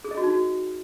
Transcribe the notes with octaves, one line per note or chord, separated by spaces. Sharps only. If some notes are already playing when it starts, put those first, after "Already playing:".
G#4
D#5
F#4
D#4
F#4